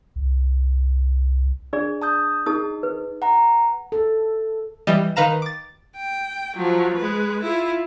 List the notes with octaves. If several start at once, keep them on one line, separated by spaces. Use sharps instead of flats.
C2
D4 G#4 D5
A5 D#6 G6
D#4 G#4 A5 D#6
B4
F#5 A#5
A4
E3 G3 D#5
D#3 B4 F5 A#5 E7
D6 A6
G5
F3 F#3
G#3 B4
E4 F4